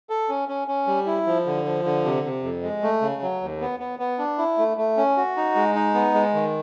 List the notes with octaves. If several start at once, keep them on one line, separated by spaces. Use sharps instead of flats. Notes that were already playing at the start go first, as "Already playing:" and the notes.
A4
C#4
C#4
C#4
G3
E4
F3
D3
F3
D3
C3
C3
F2
G#3
A3
C#3
F#3
D#2
B3
B3
B3
D4
E4
A3
A3
C#4
F#4
D#4
G#3
D#4
B3
G#3
D#3